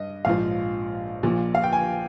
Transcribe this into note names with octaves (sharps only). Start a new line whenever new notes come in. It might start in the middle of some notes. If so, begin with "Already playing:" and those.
Already playing: G2 D#5
A#1 G#2 F3 F5
A#1 A#2 F3
F5
G5
G#5